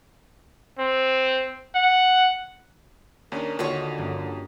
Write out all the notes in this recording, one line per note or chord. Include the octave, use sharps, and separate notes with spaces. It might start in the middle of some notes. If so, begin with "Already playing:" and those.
C4
F#5
D#2 C#4 D4 A#4
D#2 D3 D#4 F4 F#4 C#5
G2 A#3 C#4